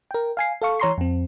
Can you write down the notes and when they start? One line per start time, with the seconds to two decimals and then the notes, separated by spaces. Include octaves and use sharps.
0.11 A#4 G5
0.37 F5 G#5 C7
0.62 A4 F5 C#6
0.80 E3 C#5 A#5 C6 C#6 C7
0.98 F2 C4